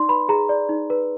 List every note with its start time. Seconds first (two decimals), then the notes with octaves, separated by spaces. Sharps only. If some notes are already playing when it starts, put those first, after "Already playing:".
Already playing: D#4 D5 C6
0.09 B4 B5
0.29 G#4 A#5
0.49 D5
0.69 D#4
0.90 B4